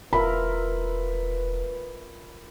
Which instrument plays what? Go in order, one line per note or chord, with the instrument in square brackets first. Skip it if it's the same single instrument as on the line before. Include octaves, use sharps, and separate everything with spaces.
[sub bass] E1 [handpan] F4 A#4 E5 [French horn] B4 [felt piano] B5